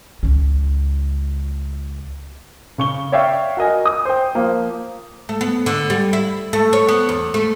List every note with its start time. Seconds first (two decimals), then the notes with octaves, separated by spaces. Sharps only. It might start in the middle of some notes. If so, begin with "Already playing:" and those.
0.23 C#2 C#4
2.78 C#3 C#6 G7
3.12 C#5 D5 E5 F5 G5 C#6
3.57 F#4 A#4 D#5 G#5
3.86 D#6
4.05 C5 G5
4.35 F3 A#3
5.29 A3
5.41 B3
5.66 D3
5.90 G3
6.13 E4
6.53 A3
6.73 C#5
6.89 B3
7.09 E2
7.34 A3